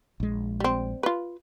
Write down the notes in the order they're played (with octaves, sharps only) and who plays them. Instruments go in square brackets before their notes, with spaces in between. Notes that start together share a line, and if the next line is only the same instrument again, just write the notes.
[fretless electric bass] A#1 G#3
[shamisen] G3 C4
F4 B4